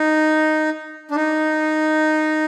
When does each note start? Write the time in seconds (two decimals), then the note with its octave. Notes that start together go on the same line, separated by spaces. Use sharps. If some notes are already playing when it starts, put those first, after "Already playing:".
Already playing: D#4
1.11 D4
1.16 D#4